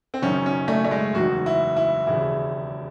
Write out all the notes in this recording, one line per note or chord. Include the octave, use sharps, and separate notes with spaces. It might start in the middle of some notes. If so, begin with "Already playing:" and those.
C4
F#1 F#2 D#3 C#4
C#4
A3
A3
G#3
F#1 E2 D#3 F#4
E4
E4
E1 D#2 C#3 E3 E4